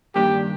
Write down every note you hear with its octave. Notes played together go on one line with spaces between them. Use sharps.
G2 D#3 A#3 D4 G4